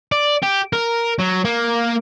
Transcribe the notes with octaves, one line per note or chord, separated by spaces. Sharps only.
D5
G4
A#4
F#3
A#3